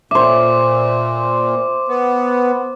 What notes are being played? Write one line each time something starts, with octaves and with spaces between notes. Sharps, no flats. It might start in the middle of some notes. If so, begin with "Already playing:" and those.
A#2 C5 E5 D6
B3